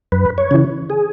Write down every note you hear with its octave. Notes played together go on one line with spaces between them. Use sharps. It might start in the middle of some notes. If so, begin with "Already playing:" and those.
F#2 B4
C#5
C#3 E3
G#4